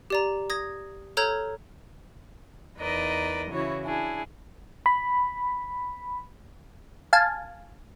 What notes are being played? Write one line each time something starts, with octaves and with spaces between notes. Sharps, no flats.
G4 D5 A#5
D#6 G#6 A#6
A4 C#5 A#5 F6 G6 G#6
E2 D#4 A#4 B4 D5 D#5
C#3 E3 E4 F#4 C#5
D4 E4 G#4
B5
F5 G#5 A5